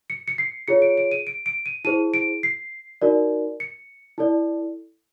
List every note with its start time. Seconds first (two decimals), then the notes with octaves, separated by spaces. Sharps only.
0.10 C#7
0.28 C#7
0.38 C7
0.68 F4 G#4 C#5 C#7
0.82 D7
0.98 D7
1.12 D#7
1.27 D7
1.46 D7
1.66 D#7
1.85 E4 G#4 C5 D#7
2.14 D7
2.43 C7
3.02 D#4 F#4 A#4 D5
3.60 C#7
4.18 E4 A4 D5